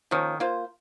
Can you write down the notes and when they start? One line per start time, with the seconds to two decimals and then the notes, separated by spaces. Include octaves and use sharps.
0.11 D#3 F3 A#3 C#4
0.40 A#3 F4 C5